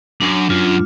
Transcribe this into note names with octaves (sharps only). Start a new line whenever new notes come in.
F#2 D4
F#2 F4